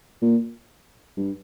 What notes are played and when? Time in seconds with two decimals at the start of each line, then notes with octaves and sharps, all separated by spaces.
0.22 A#2
1.17 G2